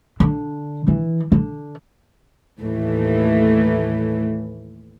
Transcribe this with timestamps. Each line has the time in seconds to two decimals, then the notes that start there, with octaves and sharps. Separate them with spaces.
0.20 D3
0.88 E3
1.32 D3
2.59 D#2 A2 E3 A3